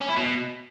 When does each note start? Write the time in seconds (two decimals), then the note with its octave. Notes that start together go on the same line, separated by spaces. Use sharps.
0.01 C#4
0.09 E4
0.16 B2